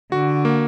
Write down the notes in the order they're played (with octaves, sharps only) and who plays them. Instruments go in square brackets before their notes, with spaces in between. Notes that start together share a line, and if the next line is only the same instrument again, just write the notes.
[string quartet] D3 [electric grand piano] F#4
[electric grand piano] A#3